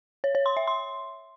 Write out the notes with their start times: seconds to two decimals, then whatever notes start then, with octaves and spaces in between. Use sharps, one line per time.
0.24 C#5
0.35 C#5
0.46 C6
0.57 E5
0.67 C6